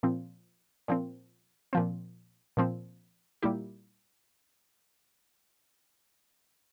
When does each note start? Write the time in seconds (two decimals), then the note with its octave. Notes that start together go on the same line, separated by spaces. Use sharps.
0.03 A#2 F3 C4
0.88 A#2 F3 C4
1.73 A#2 F3 C4
2.57 A#2 F3 C4
3.43 A#2 G3 A#3 E4 G4